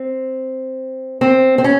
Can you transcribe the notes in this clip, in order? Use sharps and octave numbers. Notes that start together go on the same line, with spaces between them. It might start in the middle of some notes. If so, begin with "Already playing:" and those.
Already playing: C4
C4
C4
C#4